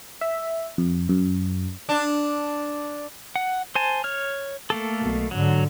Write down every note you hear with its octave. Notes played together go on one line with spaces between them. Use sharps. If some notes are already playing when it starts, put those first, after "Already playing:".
E5
F2
F#2
D4
F#5
C5 G#5 A5
C#5 F6
A3 A#3 A4
B1 B2
G#2 D3 F#3